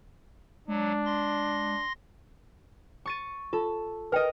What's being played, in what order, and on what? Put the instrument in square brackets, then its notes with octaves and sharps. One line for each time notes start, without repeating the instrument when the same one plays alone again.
[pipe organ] F#3 [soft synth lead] G#3 [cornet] D4
[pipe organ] C6 A#6
[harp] C#6 A6 D#7
[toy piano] F4 [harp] A4
[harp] A#4 D#5 [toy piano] B4 G5